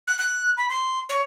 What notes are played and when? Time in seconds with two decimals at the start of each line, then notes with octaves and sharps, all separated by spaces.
0.07 F#6
0.19 F#6
0.57 B5
0.69 C6
1.09 C#5